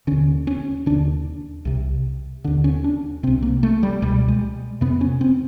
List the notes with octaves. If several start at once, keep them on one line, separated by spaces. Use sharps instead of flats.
D#2 D3 C#4
C#4
D#2 D3 D4
C2 C3
D#2 D3 D4
C#4
D4
C2 C3 C4
A#3
A3
G3
C#2 B2 G3
G#3
F2 C3 B3
C#4
C4